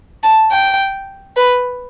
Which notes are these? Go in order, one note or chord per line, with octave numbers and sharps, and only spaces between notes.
A5
G5
B4